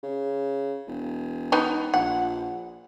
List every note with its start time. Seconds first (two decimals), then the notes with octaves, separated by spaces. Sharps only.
0.03 C#3
0.87 E1
1.52 B3 D#4
1.94 A#1 F#5